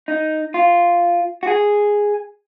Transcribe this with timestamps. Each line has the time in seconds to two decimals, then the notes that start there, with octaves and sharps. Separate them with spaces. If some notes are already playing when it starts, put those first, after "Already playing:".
0.08 D#4
0.54 F4
1.43 F#4
1.47 G#4